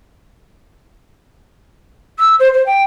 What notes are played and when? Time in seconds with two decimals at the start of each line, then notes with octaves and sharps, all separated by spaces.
2.19 E6
2.40 C5
2.54 C5
2.66 G5